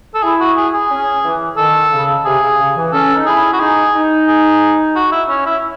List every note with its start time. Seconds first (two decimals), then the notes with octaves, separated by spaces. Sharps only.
0.15 A4
0.23 E4 G#4
0.40 F#4
0.57 G#4
0.74 G#4
0.91 C#4
1.23 E3
1.57 D#3 A4
1.91 C#3
2.25 C3 G#4
2.42 C#3
2.59 C#3
2.76 E3
2.92 C#4 A4
3.14 D#4
3.26 E4 G#4
3.53 F#4
3.60 D#4 G#4
3.94 D#4
4.28 G#4
4.96 F#4
5.12 E4
5.29 C#4
5.46 E4